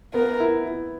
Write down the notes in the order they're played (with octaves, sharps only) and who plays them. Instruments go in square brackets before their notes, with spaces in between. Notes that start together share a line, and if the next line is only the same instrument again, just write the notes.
[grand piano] B3 [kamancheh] A#4
[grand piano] E4
E4